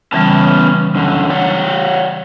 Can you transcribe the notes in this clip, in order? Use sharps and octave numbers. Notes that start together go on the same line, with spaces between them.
C#3 E3 G3 B3 C#4 A5
F#2 D3
C#5 D5 F#5